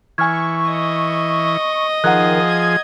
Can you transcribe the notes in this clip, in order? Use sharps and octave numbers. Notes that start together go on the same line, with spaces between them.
E3 G#5 C#6 F6 G#6
D#5
D#3 F3 G#4 F#5 A#5 F#6
G#6